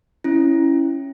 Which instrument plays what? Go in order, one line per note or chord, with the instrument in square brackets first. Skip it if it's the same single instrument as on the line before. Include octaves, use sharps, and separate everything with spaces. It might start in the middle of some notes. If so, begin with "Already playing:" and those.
[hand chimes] C#4 E4